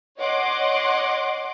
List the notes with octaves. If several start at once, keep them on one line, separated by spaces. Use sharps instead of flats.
C#5 D#5 F#5 C6 D6